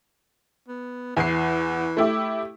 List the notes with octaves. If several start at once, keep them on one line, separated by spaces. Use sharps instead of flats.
B3
E2 E3 C7
A3 E4 G4